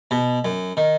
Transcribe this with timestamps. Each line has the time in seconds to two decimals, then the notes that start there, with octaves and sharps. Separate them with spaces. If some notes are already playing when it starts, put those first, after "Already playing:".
0.11 B2
0.45 F#2
0.77 D#3